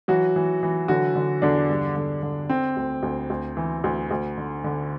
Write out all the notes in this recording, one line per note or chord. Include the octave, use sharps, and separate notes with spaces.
E3 F#3 F#4
E3
E3
D3 F#3 F#4
D3
E2 D3 D4
G2
D3
D3
D3 C4
D2
D2
D2
E3
D2
D2
D3
D3